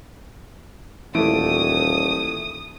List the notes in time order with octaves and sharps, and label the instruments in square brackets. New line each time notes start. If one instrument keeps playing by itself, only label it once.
[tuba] D#1 [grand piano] E3 A3 D7 [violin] D#6